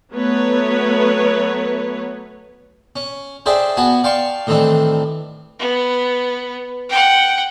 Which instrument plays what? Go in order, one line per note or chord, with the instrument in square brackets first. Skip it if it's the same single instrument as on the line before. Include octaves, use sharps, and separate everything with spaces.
[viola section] F#3 A3 B3 B4 C#5
[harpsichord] C#4
D4 G#4 C5 D5 E5 G5
B3 F#4 G#5 A5
D5 F5 G5 A5 C6 C#6
A2 D#3 E3 C4 D4
[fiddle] B3
F#5 G5